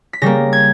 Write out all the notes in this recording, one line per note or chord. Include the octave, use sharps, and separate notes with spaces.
B6
C#3 G3 A#3 A#6
G#6